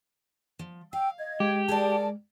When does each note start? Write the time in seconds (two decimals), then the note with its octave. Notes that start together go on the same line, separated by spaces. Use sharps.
0.59 F3
0.93 F5 G5 E6
1.18 D#5 G#6
1.40 G#3 G4
1.69 G#4 A#4 D5 A5